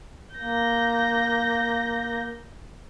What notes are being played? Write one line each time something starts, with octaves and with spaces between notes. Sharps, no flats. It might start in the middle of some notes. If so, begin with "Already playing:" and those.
A#3 G6 A#6